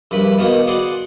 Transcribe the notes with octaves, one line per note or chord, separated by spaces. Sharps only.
A#1 G2 B4 B5
B2 D#3 A#3 B3
F#4 G#4 C5 D5 F#5